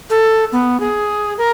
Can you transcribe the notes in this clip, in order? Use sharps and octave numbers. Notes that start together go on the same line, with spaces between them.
A4
B3
G#4
A#4